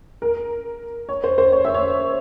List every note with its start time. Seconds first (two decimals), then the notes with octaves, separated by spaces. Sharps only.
0.22 A#4
1.09 C#5
1.24 C5
1.38 C5
1.52 C#5
1.65 E5
1.74 C#5